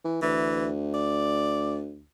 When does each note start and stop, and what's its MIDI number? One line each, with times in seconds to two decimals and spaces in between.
0.04 0.19 52
0.22 2.04 38
0.22 0.68 52
0.94 1.79 74